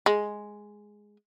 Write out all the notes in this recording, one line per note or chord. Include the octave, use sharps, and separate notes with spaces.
G#3